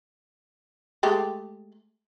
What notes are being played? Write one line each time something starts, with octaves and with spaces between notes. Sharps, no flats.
G#3 A3 G4